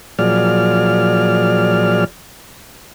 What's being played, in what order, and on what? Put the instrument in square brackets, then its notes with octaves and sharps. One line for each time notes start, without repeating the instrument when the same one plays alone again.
[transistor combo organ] A#2 F3 F#3 G#4 D5 F6